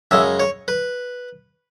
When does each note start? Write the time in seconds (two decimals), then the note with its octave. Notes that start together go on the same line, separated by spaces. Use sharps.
0.11 F#2 C#3 G#3 E5
0.40 C#5
0.68 B4